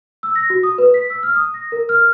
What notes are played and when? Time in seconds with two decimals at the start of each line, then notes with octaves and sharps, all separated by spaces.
0.23 E6
0.36 A#6
0.50 F#4
0.63 D#6
0.78 B4
0.94 B6
1.10 E6
1.23 F6
1.36 D#6
1.54 A#6
1.72 A#4
1.89 F6